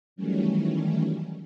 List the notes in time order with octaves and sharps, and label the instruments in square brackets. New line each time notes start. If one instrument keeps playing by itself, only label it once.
[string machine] D#3 E3 F#3 G3 A3 C#4